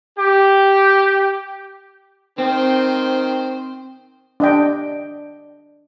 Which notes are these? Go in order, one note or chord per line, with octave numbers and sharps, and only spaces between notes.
G4
D#3 C4 C5 G5
D4 D#5 G5